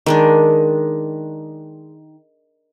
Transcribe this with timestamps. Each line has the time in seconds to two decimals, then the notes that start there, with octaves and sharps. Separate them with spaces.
0.06 D#3 G#3 D4